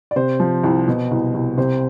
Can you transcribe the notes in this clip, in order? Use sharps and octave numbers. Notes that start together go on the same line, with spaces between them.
D5
C3 C5
F3
C2
B2
C2
C2
C3 C5